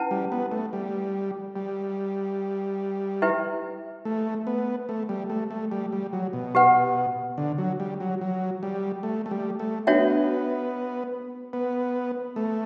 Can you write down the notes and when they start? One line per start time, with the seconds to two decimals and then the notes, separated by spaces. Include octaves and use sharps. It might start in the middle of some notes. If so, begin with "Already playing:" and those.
Already playing: C#4 E4 B4 F#5 A5
0.11 G3
0.32 B3
0.51 A3
0.73 G3
1.56 G3
3.22 E4 G4 B4 E5 G5
4.05 A3
4.47 B3
4.89 A3
5.09 G3
5.30 A3
5.51 A3
5.72 G3
5.92 G3
6.13 F#3
6.33 B2
6.55 G4 B4 F#5
7.38 D3
7.58 F#3
7.80 G3
8.00 F#3
8.21 F#3
8.63 G3
9.03 A3
9.26 A3
9.31 G3
9.59 A3
9.87 B3 D4 F#4 C#5 E5 G5
11.53 B3
12.36 A3